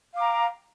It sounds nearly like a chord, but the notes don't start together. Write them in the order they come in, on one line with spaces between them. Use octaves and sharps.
F5 D6 A#5 G5